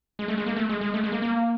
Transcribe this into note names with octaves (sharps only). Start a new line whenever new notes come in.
G#3
A3
G#3
A#3
A3
G#3
G#3
A3
G#3
A#3
A#3